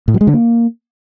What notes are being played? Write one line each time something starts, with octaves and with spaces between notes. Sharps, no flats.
A2
F#3
G#3
D3
A#3